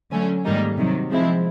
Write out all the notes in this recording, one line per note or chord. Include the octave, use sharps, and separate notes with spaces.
D3 F#3 A3 C#4
G#2 D#3 G3 A#3 D#4
C3 D#3 F#3
F3 G#3 C4 E4